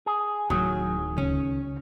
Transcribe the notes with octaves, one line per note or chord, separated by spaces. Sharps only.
G#4
D1 D#3 F#3 G#4
C#2 C#4